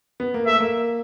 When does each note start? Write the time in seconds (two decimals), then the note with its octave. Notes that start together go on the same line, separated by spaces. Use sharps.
0.20 B3
0.34 A#3
0.46 A3 E5
0.60 A#3